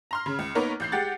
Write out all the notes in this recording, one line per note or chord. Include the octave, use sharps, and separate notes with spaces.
A#5 C6 F6
C#3
C#2
A#3 B3 D#4 A#4 C#5
A1 G6 C7
G#3 G4 F#5 A6